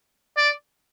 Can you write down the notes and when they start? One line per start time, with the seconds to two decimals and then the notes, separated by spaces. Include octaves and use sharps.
0.37 D5